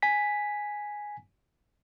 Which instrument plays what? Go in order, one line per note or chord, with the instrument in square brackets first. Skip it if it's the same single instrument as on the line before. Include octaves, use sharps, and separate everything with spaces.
[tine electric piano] G#5 B6